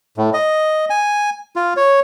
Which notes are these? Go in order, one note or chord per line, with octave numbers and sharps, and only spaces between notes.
A2
D#5
G#5
F4
C#5